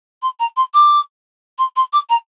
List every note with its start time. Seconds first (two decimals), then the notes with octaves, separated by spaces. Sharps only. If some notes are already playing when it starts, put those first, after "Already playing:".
0.22 C6
0.39 A#5
0.56 C6
0.74 D6
1.58 C6
1.76 C6
1.93 D6
2.09 A#5